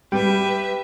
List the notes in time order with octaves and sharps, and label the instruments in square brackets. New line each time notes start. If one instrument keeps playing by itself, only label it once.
[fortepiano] G3 [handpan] G4 [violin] B4 E5 [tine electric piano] G5